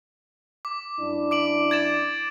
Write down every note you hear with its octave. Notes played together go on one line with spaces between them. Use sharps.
D6
F#2 D4 E4
D6 D7 F#7
G#6 A6 E7